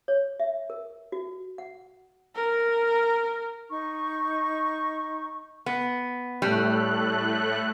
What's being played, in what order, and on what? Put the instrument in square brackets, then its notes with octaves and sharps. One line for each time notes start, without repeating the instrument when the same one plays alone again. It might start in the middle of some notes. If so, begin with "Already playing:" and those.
[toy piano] C#5
E5
A#4
F#4
F#5
[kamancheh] A#4
[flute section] D#4 C#6
[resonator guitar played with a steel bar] B3
[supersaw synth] A2 A3 F#6 [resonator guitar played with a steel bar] G3